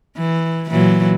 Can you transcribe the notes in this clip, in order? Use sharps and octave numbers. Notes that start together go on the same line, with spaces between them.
E3
A#2 E3 F#3